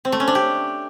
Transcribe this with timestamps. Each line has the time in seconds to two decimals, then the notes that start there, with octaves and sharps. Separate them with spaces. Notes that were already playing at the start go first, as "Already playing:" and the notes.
0.05 C4
0.12 A3
0.20 C#4
0.27 D4
0.35 G4